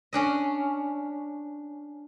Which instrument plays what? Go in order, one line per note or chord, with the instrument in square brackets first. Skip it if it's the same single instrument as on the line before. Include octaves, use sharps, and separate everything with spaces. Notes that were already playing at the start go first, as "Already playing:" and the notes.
[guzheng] C#4 D4 D#5